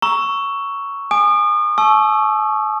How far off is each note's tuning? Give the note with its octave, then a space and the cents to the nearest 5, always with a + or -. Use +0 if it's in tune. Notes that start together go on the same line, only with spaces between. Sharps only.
A#5 +10 C#6 +5 E6 +0
G#5 +0 D#6 -35
A5 -40 C#6 +0 E6 +5